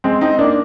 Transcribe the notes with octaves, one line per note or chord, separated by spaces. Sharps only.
G#3 C4
C4 D#4
A#3 D4